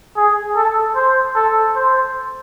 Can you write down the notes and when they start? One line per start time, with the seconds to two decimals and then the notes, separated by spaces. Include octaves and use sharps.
0.17 G#4
0.56 A4
0.96 C5
1.35 A4
1.76 C5